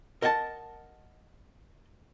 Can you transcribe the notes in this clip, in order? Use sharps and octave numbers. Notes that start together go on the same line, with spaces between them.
A#4 D#5 F#5 G#5 A5